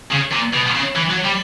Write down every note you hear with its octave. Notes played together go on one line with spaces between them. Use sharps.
C#3
A#2
B2
C#3
E3
F#3
G3